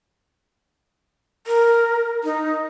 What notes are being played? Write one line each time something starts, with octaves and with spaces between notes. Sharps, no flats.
A#4
D#4